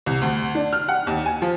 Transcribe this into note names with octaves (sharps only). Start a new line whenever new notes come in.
C2
D2
D4
F6
F#5
D#2
G#5
F3